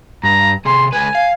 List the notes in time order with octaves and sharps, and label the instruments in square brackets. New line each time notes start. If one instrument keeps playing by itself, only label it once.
[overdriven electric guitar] G2 [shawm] A#5
[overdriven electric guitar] C3 G#4 [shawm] C6
[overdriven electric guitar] C#2 B4 [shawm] G#5
[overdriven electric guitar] F5